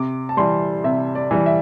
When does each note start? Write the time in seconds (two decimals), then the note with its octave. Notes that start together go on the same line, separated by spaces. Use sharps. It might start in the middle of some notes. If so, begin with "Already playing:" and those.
Already playing: C3 D6
0.29 A5
0.37 E3 G3 C6
0.84 C3 E5
1.15 D5
1.31 E3 G3
1.46 E5